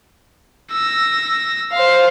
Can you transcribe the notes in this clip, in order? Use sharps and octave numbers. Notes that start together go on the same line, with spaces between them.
E6 A#6
C5 F5